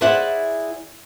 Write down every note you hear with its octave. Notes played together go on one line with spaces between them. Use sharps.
E4 G#4 C5 D5 E5 F#5